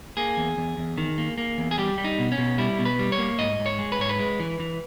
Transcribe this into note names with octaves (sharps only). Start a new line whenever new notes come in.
A#3 G#4
E2
E2
E2
D#3
A#3
A#3
E2
G#4
G3 G4
G3
D#4
B2
C#4
B2
G3 E4
B2
B4
G3
C#5
A#3
G#2 D#5
G#2
C#5
G#3
B4
G#2 C#5
B4
G#3
E3
E3